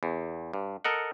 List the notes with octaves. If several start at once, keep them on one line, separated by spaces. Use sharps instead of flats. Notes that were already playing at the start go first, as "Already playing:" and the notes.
E2
G2
A4 A#4 D#5 F#5